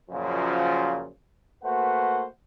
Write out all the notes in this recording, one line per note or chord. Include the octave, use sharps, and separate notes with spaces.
F#2 A#2 C#3 F3
A3 A#3 F#4 B4 C5 F#5